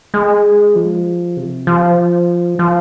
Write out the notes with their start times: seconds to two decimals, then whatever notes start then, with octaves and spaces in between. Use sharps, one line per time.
0.14 G#3
0.75 F3
1.37 C3
1.67 F3
2.59 F3